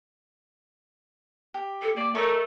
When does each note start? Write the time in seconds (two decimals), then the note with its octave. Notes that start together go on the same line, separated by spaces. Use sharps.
1.54 G4
1.82 A4
1.96 A#3 D5
2.15 A3 A#4 C#5 D#5 A#5